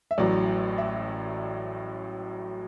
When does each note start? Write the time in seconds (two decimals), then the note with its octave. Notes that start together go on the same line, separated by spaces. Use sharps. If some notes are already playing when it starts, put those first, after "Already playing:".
0.11 E5
0.18 A1 A2 F#3 D5
0.78 E5